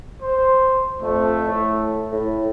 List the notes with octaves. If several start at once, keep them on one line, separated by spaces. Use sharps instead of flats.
C5
F2 A3
A2
A2